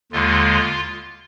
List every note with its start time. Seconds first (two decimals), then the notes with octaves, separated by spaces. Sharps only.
0.12 D#2 D3 G#3 F4